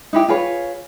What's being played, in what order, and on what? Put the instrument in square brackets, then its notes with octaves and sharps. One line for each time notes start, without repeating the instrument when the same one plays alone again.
[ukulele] D#4 E4 G4
F4 G#4 B4 C#5